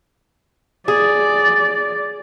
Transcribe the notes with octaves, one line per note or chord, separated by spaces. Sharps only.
G#4 D5